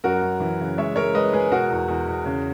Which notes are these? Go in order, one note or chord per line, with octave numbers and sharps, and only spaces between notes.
F#2 F#4 A#4
F#2
E3
C#3
G#3 C#5 E5
G#3 A#4 C#5
G#3 B4 D#5
G#3 G#4 B4
B2 F#4 A#4
E2
E2
E2
C#3